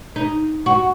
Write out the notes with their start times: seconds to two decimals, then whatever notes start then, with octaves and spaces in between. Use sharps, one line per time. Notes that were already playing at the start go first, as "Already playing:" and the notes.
0.16 D#4
0.66 F#4